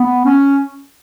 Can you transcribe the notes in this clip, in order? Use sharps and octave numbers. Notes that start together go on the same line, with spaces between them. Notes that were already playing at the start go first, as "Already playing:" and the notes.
Already playing: B3
C#4